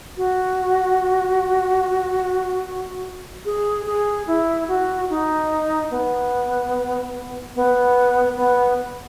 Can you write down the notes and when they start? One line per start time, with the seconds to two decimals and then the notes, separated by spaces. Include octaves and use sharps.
0.17 F#4
3.45 G#4
3.86 G#4
4.27 E4
4.68 F#4
5.10 D#4
5.91 B3
7.56 B3
8.37 B3